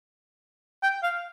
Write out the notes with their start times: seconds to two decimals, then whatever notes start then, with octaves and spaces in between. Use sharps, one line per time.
0.83 G5
1.03 F5